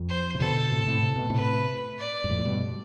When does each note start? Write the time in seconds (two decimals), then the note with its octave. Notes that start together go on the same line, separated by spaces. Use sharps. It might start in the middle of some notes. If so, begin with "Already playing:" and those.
Already playing: F2
0.09 C5
0.35 C3
0.40 B2 D3 A4
0.72 A2 C3
0.87 A2 C3
1.03 C3
1.16 B2
1.30 A2 C3 B4
1.99 D5
2.24 G2
2.30 F2 A2
2.45 G2 B2